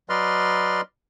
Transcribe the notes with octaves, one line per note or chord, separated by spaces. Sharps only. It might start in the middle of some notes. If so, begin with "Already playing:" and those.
F#3 B4 D5 D#5 C6 F6